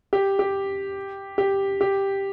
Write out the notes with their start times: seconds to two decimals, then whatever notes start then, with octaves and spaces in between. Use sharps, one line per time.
0.13 G4
0.39 G4
1.38 G4
1.81 G4